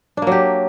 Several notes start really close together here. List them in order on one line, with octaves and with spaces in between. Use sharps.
D4 A#3 F#3 G4